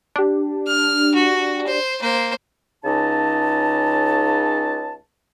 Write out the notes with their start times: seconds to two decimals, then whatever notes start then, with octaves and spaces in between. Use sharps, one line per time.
0.16 D4 G4
0.67 F6
1.15 F#4
1.67 C5
2.01 A#3 C5
2.84 C#2 C#3 D#4 A5